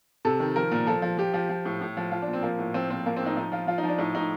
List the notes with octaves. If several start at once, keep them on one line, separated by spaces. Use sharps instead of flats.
C3 A4
D#3
F3 A#4
A#2
F3 A4
F3
F3 G4
F3
F3
A2
A2
F3
F3 F4
D4
A#2
C4
F3 A#3
A2
F3 C4
A#2 C4
F3 A#3
C4
A2
D#4
F3 D#4
F3 F4
F3 F4
D#4
F3
D4
A2 D#4
A2 D#4